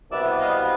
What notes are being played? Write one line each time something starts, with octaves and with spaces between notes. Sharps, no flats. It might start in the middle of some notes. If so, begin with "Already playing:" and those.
C2 B2 G3 B3 D5 E5
D#5 F5